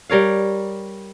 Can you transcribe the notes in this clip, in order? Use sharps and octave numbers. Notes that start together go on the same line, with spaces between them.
G3 A#4 C#5 F5